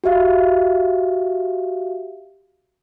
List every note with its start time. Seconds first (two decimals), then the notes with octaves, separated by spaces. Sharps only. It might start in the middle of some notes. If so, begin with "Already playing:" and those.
0.04 F#4 G4 E5 F5